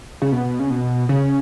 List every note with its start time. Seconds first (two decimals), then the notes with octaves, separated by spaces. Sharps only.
0.22 C#3
0.32 B2
0.59 C#3
0.70 B2
1.09 C#3